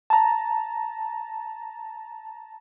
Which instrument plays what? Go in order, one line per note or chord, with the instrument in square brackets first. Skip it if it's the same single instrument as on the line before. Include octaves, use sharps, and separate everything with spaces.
[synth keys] A5 A#5